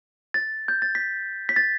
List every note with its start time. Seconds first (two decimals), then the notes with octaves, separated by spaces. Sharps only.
0.34 A6
0.68 G6
0.82 A6
0.95 B6
1.49 B6
1.56 A6